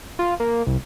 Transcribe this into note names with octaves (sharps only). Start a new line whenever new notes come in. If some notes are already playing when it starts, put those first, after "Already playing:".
F4
A#3
C2